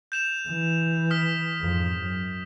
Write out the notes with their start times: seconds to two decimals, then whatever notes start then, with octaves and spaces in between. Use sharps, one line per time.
0.12 G6 E7 F7
0.49 E3
1.10 D#6 F6 B6
1.61 F2 G#2
2.00 F#2